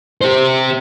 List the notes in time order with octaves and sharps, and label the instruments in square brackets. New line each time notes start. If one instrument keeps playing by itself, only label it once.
[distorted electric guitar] G4 C5